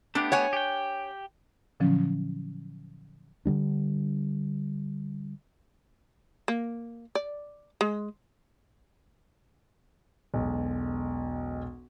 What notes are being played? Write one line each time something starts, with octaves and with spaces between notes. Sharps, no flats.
A3 B3 D4 G4
C#5 F#5 G#5
G4 G5
A#2 D3 F3 F#3 C#4
D3 E3 G3 D4
A#3
D5
G#3
E1 B1 G#3